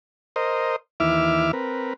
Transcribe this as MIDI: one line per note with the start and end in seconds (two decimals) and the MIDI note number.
0.36 0.76 70
0.36 0.76 72
0.36 0.76 75
1.00 1.51 39
1.00 1.51 52
1.00 1.51 64
1.00 1.51 76
1.00 1.51 86
1.00 1.51 89
1.53 1.93 60
1.53 1.93 70
1.53 1.93 71